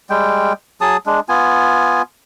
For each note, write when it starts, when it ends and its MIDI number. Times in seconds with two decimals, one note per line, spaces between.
0.10 0.53 55
0.10 0.53 56
0.10 0.53 79
0.81 0.97 54
0.81 0.97 68
0.81 0.97 81
0.81 0.97 87
1.06 1.20 56
1.06 1.20 62
1.29 2.02 59
1.29 2.02 65
1.29 2.02 80